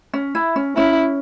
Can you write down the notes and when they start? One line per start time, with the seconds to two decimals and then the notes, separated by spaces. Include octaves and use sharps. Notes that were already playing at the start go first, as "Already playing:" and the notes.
0.14 C#4
0.35 E4
0.56 C#4
0.77 C#4 E4